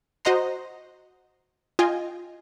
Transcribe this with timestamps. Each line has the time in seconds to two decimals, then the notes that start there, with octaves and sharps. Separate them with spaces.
0.25 F#4 C5 D#5 F#5 A#5 C6
1.79 F4 D#5 G5 G#5